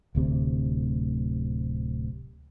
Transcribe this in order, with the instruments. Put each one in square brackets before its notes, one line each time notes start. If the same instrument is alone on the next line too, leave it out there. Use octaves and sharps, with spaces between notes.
[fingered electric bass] D1 D2 C3